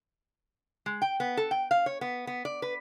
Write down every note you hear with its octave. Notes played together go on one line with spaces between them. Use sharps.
G#3
G5
B3
A4
G5
F5
C#5
B3
B3
D5
B4